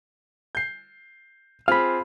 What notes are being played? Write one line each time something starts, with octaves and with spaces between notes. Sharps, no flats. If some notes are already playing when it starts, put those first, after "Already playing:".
G6 C7
C4 F4 G#4 F5 B5